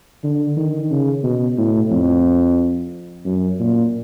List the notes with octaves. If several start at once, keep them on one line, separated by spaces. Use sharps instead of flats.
D3
D#3
C#3
B2
A2
F2
F#2
A#2